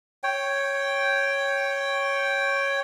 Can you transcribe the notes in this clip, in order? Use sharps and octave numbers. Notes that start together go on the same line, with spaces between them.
C#5 G5